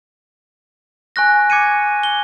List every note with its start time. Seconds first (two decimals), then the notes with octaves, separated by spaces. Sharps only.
1.16 G#5 C#6 F#6 A#6
1.50 D6 G#6 C#7 D#7
2.03 G7